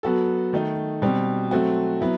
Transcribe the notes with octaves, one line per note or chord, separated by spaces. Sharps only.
F#3 B3 F#4 A4
D#3 A3 D#4
B2 G3 C4
F#3 A3 C4 F#4
F#3 B3 E4